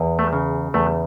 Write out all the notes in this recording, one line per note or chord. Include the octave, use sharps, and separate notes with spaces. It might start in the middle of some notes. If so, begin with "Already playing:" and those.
Already playing: E2
A3
C#3
E2 A3